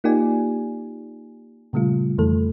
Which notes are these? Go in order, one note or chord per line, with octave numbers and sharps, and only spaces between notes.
A#3 D#4 F4 G4 D5 G#5
A#2 C#3 G3 A3 F4
F2 D#3 E3 A3 A4